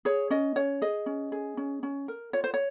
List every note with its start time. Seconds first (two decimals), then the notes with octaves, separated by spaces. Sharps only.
0.05 G#4 C#5
0.30 C#4 D#5
0.56 C#4 C#5
0.82 G#4 D#5
1.06 C#4
1.32 G#4
1.57 C#4
1.83 C#4
2.08 A#4
2.33 F4 C#5
2.44 C5
2.54 C#5